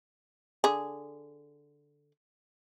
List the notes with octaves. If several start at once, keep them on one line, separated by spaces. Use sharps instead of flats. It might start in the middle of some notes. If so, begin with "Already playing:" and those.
D3 G#4